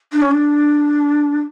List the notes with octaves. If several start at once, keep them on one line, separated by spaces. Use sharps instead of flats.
D4
C#4
D4